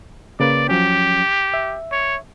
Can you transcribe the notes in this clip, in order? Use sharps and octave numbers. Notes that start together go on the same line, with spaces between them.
C#3 A#3 B4 D5
F3 F#3 C#4 G4
E5
C#5